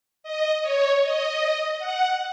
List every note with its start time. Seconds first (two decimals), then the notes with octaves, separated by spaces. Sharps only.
0.23 D#5
0.62 C#5
1.02 D#5
1.79 F#5